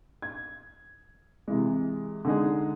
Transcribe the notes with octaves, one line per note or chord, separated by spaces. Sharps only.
G#6
C3 E3 G#3
D3 G#3 D#4 G#4